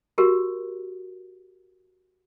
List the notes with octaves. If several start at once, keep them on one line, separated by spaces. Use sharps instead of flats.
F#4 G4 A#4